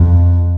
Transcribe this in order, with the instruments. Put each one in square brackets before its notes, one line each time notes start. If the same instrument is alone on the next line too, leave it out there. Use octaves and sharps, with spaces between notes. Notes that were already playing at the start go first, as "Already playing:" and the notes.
Already playing: [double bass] F2